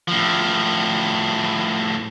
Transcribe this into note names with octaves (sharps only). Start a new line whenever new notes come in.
A2 F3